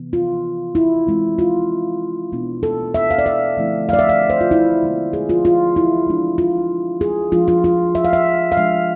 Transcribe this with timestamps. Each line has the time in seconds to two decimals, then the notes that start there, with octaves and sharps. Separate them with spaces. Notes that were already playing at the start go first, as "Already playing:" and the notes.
Already playing: C3 E3 B3
0.13 F4
0.75 E4
1.07 E3 G#3 C4
1.39 F4
2.32 B2 B3 D4
2.63 A4
2.94 E5
3.11 F5
3.18 D5
3.26 E5
3.57 D3 F3 A3 C4 E4
3.89 D5 F5
3.99 E5
4.09 F5
4.30 C5
4.41 F4
4.51 E4
4.82 D3 G#3 B3 E4
5.13 G#4
5.29 F4
5.45 F4
5.76 E4
6.07 F3 G#3 D4
6.38 F4
7.01 G#4
7.32 F3 G#3 D4 F4
7.48 F4
7.64 F4
7.95 E5
8.05 F5
8.13 E5
8.52 F5
8.57 F3 G#3 D4 E5